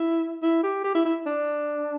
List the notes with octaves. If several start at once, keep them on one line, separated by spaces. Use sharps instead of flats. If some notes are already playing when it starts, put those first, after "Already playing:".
Already playing: E4
E4
G4
G4
E4
E4
D4